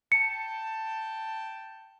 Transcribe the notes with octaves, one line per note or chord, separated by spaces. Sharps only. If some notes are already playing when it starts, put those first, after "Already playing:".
G5 A5 C#7